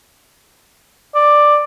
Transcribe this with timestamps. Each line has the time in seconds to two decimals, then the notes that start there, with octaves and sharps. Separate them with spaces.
1.15 D5